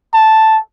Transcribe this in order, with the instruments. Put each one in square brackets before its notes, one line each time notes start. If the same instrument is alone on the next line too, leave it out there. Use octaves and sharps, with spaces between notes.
[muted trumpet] A5